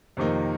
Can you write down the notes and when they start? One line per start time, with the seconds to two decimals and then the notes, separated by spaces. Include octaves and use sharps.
0.17 F2 C3 D#3 A#3 D#4